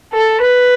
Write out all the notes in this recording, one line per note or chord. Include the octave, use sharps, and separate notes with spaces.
A4
B4